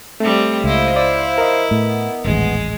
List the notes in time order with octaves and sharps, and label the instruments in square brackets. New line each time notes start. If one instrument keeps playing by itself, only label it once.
[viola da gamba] G3 C4 [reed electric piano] A3
[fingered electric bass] C#2 [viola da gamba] E4 D#5 [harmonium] C5 F5
[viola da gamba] E4 [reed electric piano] D5
[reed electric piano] A#4 D#5
[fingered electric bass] A2 [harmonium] B3
[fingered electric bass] D#1 A1 [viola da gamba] G#3